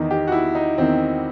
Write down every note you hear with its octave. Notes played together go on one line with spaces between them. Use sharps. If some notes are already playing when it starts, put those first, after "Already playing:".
Already playing: E2 D#3 D#4
G4
F#4
E4
D#4
E2 D#3 C4